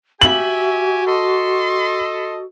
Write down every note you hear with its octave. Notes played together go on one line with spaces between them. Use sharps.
F#4 G4 E5 G#5 F#7
A4 D#5 C6